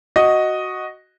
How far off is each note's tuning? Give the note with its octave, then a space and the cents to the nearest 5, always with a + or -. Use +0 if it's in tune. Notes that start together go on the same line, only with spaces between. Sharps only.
F#4 +0 D#5 +0